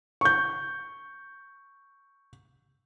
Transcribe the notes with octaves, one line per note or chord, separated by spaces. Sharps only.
C#6 G6